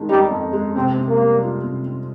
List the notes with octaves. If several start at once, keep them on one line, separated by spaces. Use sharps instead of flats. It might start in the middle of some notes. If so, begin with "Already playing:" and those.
Already playing: F2 D#3 G#3
G3 D#4
F2
G#3
C3 C4
C4
A#3
G3
F4
C3
C4